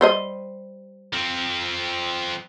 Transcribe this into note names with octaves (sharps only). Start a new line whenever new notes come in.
G3 C5 D#5
F3 C4